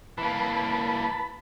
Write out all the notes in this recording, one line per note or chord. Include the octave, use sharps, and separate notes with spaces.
E3 A#3 B4 A5 B5